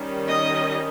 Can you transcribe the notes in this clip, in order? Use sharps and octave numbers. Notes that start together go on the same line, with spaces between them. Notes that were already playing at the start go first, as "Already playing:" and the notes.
Already playing: D#3 G3 C#4
D#5